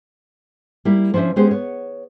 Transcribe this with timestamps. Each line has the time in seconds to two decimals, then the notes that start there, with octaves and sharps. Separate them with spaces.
0.85 G3 A#3 E4
1.14 F3 C#4 D4 C5 E5
1.36 G#3 B3 C#4 G4 G#4 C5
1.51 B3 C#5